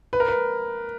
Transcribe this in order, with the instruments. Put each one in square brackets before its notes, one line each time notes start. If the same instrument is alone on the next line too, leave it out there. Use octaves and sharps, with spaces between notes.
[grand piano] B4
A#4
B4